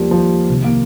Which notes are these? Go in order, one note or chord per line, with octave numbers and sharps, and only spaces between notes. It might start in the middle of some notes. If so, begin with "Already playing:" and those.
Already playing: D#2 D#3 F3 G3 A#3
F3
C2 C3 D#3
A#3